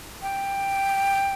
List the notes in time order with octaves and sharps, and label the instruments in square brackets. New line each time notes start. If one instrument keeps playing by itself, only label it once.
[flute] G5